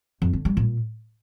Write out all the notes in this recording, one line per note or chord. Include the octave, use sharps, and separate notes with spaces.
F2
D3
G3
A#2